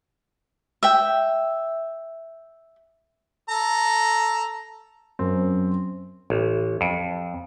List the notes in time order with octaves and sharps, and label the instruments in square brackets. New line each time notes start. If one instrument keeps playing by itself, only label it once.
[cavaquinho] E5 G5
[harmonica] A4 A#5
[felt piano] F#2 [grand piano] C4
[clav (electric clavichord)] A1
F2